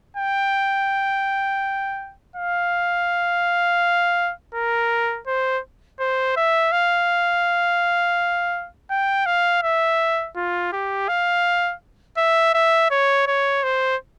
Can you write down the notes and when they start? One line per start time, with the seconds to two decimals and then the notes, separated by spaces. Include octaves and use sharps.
0.17 G5
2.36 F5
4.55 A#4
5.27 C5
6.00 C5
6.37 E5
6.72 F5
8.90 G5
9.26 F5
9.63 E5
10.36 F4
10.73 G4
11.09 F5
12.17 E5
12.54 E5
12.91 C#5
13.27 C#5
13.64 C5